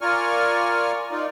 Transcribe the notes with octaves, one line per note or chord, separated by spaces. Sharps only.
F4 A#4 D5 G#5 C#6 F6
D#4 F4 D5